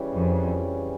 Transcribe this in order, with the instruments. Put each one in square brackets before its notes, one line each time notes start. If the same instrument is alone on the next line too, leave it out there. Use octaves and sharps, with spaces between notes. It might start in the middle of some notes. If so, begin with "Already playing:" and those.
Already playing: [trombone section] C#3 E3 G3 C#4
[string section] F2